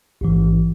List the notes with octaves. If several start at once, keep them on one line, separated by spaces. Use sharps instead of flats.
A1 G#2 E3